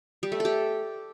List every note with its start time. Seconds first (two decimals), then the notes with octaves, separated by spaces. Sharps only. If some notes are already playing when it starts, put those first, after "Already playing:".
0.23 G3
0.32 A3
0.40 G4 A4